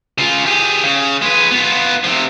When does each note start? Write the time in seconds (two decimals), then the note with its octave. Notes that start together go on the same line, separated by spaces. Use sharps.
0.18 C#3 F4
0.46 G4 G#4
0.84 C#3
1.22 G#3 B4
1.51 B3 F4
2.04 C3 F3